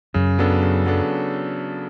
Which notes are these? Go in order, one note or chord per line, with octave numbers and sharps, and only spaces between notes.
F#2 C#3
F#3 B3 D4 A4
C#3
F#3 B3 D4 A4